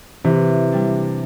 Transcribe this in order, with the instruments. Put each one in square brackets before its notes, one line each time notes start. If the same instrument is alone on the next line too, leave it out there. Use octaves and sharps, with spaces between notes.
[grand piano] C3 [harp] E3
[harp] G3 D4